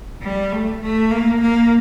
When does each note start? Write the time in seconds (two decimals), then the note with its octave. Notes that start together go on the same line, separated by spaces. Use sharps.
0.23 G3
0.52 A3
0.82 A3
1.11 A#3
1.41 A#3